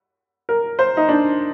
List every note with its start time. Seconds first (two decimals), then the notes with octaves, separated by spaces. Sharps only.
0.49 A#4
0.79 C5
0.97 D#4
1.09 D4